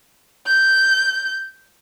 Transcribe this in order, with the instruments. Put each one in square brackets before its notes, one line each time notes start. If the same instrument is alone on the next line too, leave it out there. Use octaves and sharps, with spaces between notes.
[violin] G6